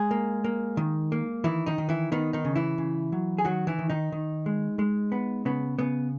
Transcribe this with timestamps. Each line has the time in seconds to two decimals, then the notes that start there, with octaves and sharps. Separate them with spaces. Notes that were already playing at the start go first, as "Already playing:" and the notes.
Already playing: G#3 G#4
0.11 A#3
0.44 A#3
0.77 D#3
1.12 A#3
1.44 D#3 E3 E4
1.66 D#3 D#4
1.78 D#3
1.89 E3 E4
2.12 D#3 B3 D#4
2.33 D#3 D#4
2.45 C#3
2.55 E3 E4
2.78 C#3
3.12 F#3
3.38 G#4
3.44 D#3 F#3 F#4
3.67 E3 E4
3.79 D#3
3.90 D#3 D#4
4.12 D#3
4.46 G#3
4.79 G#3
5.12 B3
5.45 C#3 B3
5.79 C#3 B3